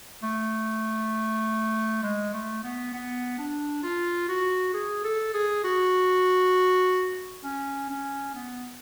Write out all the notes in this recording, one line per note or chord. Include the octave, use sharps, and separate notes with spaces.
A3
G#3
A3
B3
B3
D4
F4
F#4
G#4
A4
G#4
F#4
C#4
C#4
B3